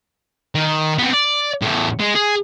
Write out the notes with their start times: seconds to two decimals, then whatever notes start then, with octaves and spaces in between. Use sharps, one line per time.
0.55 D#3
0.99 B3 C4
1.13 D5
1.62 E2 A2
2.00 G#3
2.15 G#4